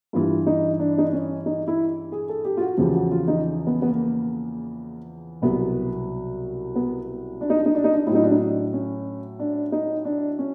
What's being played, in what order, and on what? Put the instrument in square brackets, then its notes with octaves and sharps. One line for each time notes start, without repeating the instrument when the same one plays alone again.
[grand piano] G2 E3 G3 F4
D#4
D4
D#4
D4
C#4
D#4
E4
G#4
A4
G4
F4
F#4
E2 C#3 F3 G4
F#4
F4
D#4
B3
B3
A#3
C2 B2 F#3 B3
B3
D4
D#4
D4
D#4
D4
D#4
D4
A2 E4
F#3 D#4
D4
D#4
D4
C#4
D4
D#4
D4
C#4